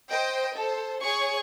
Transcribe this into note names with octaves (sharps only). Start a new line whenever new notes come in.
C5 D#5 G5
A4 C5
G#4 C#5 C#6